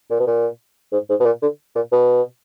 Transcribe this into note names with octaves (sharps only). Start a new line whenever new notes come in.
A#2
B2
A#2
G#2
G#2
B2
A#2
D3
A#2
B2